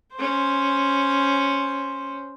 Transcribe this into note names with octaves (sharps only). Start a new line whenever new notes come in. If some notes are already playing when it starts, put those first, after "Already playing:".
C#4 C5